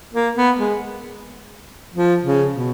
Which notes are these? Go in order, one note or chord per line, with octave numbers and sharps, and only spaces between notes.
A#3
B3
G#3
F3
C#3
B2